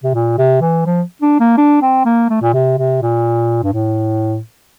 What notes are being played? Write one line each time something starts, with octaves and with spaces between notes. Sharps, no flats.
C3
A#2
C3
E3
F3
D4
A#3
D4
C4
A#3
A3
A#2
C3
C3
A#2
G2
A2